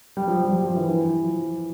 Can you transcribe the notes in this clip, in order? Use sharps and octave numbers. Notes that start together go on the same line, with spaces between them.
G3
F3
G3
G3
F3
F3
E3
E3
F3